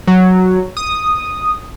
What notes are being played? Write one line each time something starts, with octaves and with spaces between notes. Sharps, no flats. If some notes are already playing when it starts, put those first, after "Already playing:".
F#3
D#6